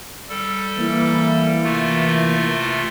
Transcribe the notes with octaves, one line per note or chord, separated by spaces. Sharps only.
G3 A4
E3 A#3 E4
C3 A3 F4